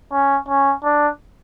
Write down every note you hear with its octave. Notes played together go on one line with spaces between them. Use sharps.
C#4
C#4
D4